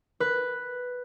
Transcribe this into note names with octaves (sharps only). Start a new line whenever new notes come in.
B4